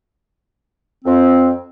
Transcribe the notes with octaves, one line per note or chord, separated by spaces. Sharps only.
F2 F3 C4